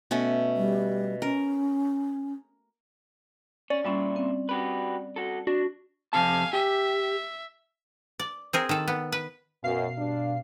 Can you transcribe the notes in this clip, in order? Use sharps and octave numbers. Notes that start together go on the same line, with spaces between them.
B2 A3 C#4
G3
C#4 A#4
C#4 D5
A#2 G3 C#4 E4 F4
C4
F#4 G4 B4
F#4 A4
D4 F#4
F2 C3 F5 G#5 A5
G4 E5
D5
C4 G#4 A#4
D#3 A4
B3
B4
F#2 B2 F5 C7
G2 D4